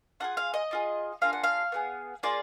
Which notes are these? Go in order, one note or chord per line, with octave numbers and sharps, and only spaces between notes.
D4 F4 G#4 F#5
F5
D#5
D4 F4 G#4
A#3 D4 F4 G#4 F5
F#5
F5
B3 D4 G#4
A#3 F4 G#4 D5